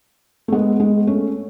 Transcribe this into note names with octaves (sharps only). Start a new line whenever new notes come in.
A3
G#3 B3
G#3 B3
A3 C#4